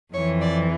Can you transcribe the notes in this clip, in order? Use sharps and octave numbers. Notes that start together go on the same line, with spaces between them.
F2 E3 C#5
D5